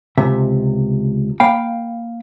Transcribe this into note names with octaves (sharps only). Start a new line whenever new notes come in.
C#2 C3 E5
A#3 F5 G5 B5